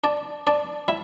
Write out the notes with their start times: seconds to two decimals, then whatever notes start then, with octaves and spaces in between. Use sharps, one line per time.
0.04 D4 D5
0.47 D4 D5
0.88 E4 E5